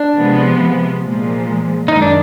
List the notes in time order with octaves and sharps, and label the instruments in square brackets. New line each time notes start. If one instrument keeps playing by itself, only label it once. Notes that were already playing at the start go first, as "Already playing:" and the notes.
Already playing: [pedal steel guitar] D4
[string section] C3 F3 G#3 B3
A#2 F3 G#3
[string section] F#2 D#3 G#3 [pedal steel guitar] D#4
[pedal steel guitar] D4